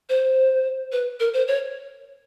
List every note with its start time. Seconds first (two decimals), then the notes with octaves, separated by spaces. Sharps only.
0.09 C5
0.92 B4
1.20 A#4
1.33 C5
1.47 C#5